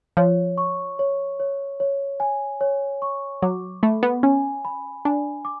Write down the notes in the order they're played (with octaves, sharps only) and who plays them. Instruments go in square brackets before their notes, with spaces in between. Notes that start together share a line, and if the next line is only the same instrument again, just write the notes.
[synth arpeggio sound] F3 [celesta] C#5
[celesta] C#6
C#5
C#5
C#5
G#5
C#5
C#6
[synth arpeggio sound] F#3 [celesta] D6
[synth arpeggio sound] A3 [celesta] B5
[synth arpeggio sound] B3
[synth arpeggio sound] C#4 [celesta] G#5
[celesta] B5
[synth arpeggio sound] D4 [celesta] G#5
[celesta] D6